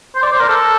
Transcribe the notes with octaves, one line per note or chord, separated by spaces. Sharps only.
C5
D5
C5
A#4
A4